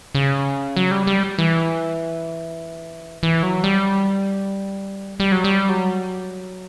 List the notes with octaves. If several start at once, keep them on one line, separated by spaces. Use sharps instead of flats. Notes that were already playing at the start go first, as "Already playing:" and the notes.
C#3
F#3
G3
G3
E3
E3
F#3
G3
G3
F#3
G3
F#3